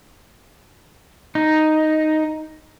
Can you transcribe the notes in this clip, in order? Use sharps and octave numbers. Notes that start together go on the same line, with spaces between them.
D#4